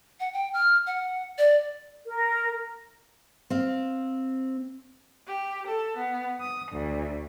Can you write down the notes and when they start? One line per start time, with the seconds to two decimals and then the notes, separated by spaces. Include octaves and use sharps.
0.20 F#5
0.33 G5
0.54 F6
0.87 F#5
1.38 D5
2.06 A#4
3.50 C4 F5
5.28 G4
5.68 A4
5.97 B3
6.40 D#6
6.73 D2